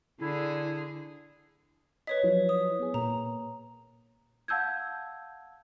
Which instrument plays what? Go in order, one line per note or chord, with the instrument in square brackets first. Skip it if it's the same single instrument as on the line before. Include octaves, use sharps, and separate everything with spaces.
[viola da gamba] D3 G#4 [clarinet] E4
[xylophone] B4 C#5 B6 [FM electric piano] D#5
[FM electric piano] F3 F#3 E4
[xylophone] D#6
[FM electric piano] B3 G#4
[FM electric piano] A#2 A#3 [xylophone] A#5
[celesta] F5 F#5 A5 E6 G6 G#6